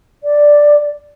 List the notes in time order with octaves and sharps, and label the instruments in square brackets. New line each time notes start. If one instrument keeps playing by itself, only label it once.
[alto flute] D5